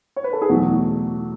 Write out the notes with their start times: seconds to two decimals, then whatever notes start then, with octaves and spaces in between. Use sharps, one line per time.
0.16 C#5
0.24 B4
0.33 A4
0.42 G#4
0.49 E2 B2 F#3 A3 F#4